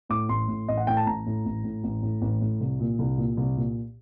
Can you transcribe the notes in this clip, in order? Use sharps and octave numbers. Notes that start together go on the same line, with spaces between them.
A2 D6
A1 C6
A2
A1 D#5
F#5
A2 G5
A5
A1 A#5
A2
A1
A2
A1
A2
A1
A2
C2
A#2
C2
A#2
C2
A#2